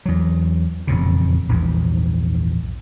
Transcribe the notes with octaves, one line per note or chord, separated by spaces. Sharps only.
E2 F#3
E1 F2 A#2 C#3
A#1 E2 G#2